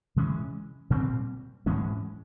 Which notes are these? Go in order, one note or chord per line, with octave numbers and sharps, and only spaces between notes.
C3 E3 G#3 C#4
A#2 G3 C4
G#2 E3 G#3 C#4